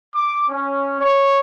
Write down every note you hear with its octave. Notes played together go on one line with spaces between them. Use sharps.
D6
C#4
C#5